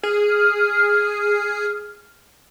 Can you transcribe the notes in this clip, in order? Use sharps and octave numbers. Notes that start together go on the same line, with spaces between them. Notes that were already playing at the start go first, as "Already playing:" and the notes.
G#4 F6